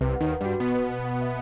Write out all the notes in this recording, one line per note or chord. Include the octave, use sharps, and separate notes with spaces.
C2 C3 B4
F#5
D#2 D#3
B4
G2 G3 F#4
B2 B3 F#5
B4
B4
F#5
E5